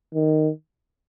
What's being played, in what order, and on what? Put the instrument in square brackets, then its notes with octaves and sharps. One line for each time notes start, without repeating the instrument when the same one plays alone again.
[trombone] D#3